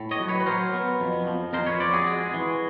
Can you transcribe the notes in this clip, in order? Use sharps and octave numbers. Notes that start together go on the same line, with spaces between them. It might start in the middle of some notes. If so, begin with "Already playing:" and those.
Already playing: A2
C#5 D#5
F#3
B4 C#5
B4
F#3 A#4 C5
B3
F2
F3
F2 A#4 C5
B4 C#5
F2 C5 D5
F#4 G#4
G#3
E3